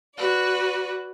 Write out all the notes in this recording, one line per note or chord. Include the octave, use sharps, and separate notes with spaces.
F#4 B4 D5